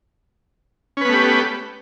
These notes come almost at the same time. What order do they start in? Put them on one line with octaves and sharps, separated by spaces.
C#4 B4 B3 A3 G4